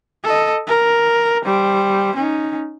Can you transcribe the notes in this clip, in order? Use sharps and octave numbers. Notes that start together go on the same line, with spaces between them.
A4 D#5
A#4
G3 C5
C#4 D#4